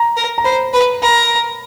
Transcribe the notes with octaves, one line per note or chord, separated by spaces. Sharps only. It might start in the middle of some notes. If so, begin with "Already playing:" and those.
Already playing: A#5
A#4
A#5
C5 B5
B4 B5
A#4 B5